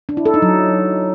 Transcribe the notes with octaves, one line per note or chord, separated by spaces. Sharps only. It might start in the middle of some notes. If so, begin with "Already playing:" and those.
D4
E4
A4
D#4
F#3